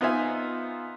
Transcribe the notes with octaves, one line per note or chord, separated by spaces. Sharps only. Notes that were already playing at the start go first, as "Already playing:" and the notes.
B3 D#4 F4 C5 E5 G#5